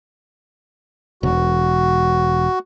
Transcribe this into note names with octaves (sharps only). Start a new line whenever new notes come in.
E1 F#4